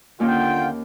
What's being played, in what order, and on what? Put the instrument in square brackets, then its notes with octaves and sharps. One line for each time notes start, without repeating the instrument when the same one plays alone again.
[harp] D#2 A#3 C#4 [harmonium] D3 [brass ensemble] F4 G5